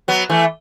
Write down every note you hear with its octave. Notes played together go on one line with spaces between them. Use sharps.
F#3 B3
E3 A3